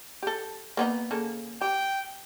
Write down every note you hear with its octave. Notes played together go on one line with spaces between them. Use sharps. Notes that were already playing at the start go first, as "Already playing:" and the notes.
G4 A4
A#3 B3 D#4
C#3 A#3 A4
G4 G5